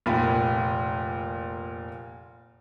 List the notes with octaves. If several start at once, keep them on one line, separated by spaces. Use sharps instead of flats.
F1 A#2 B5